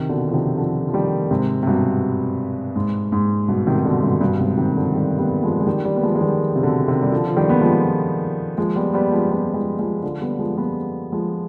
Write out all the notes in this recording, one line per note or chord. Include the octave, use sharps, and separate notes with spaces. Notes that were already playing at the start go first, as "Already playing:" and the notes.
Already playing: C3 D#3
B2 D3
F3
C3 D#3
D3 F3
F3
D#3 G3
G#2 C3
C3
G2 B2
G#2
G#2
G2 B2
C3 D#3
D#3
B2 D3
G2 B2
G2 B2
G#2 C3
C3 D#3
D3 F3
D#3 G3
G3 B3
F3 G#3
G#3
D#3 G3
D#3 G3
B3
F3 G#3
G#3
D#3 G3
C3
B2 D3
C3 D#3
G3
D3 F3
F3
D#3 G3
B3
F3 G#3
F3 G#3
G3 B3
G3 B3
F3 G#3
G3 B3
F3 G#3
F3 G#3
D3 F3
G3 B3
F3 G#3
G3 B3
F3 G#3